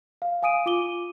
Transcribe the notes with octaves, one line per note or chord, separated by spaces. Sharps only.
F5
F5 G#5 D#6 D7 D#7
F4 D6 D#7 G7